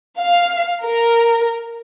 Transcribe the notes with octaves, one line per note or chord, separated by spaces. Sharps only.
F5
A#4